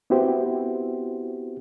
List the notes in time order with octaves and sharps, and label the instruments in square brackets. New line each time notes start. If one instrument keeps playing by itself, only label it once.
[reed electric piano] B3 C4 E4 F#4 G4 C5